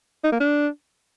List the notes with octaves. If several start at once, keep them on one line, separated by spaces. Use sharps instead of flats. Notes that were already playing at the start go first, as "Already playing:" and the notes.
D#4
A#3
D4